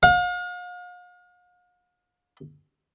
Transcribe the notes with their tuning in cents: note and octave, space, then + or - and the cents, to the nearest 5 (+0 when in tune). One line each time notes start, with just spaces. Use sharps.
F5 +40